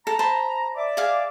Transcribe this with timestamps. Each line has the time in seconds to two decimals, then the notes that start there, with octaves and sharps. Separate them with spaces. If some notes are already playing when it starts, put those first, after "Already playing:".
0.07 A4 A#5
0.19 C5 A5 B5
0.76 D5 E5 D6
0.97 G#4 F5